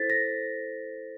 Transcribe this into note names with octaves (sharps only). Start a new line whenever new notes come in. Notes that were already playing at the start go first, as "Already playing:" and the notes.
Already playing: E4 A4 C5 A6 B6
A#6